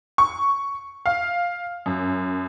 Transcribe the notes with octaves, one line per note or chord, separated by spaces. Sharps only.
C#6
F5
F#2